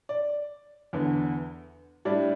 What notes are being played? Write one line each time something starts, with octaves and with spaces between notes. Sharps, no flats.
D5
E2 D3 B3
A2 G3 D4 D5